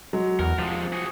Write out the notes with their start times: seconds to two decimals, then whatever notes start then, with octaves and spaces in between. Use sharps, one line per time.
0.13 F#3 G#3
0.39 E2 A#4 F#5
0.58 C3 F3 G#3 A6
0.93 F#4 G#4